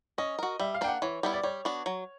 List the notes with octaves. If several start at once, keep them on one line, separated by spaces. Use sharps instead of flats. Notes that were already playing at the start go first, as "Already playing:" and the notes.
C#4 D#5
F#4 A#4
G3 E5
F5
A#3 D4 G5
F#5
E3 C#5
G3 B3 E4
D5
G3 C#5
B3 D4 F#4
F#3